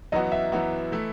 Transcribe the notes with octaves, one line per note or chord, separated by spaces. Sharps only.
F#2 E3 B3 F#4 D#5
E5
F#2 E3 B3 F#4
E3 A3 E4